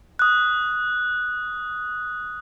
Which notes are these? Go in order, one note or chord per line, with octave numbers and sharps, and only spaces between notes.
D#6 F#6